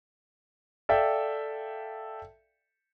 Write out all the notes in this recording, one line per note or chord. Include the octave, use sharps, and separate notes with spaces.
A4 D5 E5 F5 G5